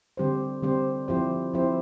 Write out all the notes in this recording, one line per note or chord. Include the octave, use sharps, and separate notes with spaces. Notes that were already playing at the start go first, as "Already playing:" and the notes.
D3 G3 C4 G4 C5
D3 G3 C4 G4 C5
F3 C4 E4 G4 C5
F3 C4 E4 G4 C5